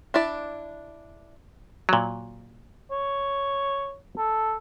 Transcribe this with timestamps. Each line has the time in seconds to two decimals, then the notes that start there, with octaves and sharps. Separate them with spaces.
0.14 D4 E4 D5
1.89 A#2 F#3
2.91 C#5
4.18 A4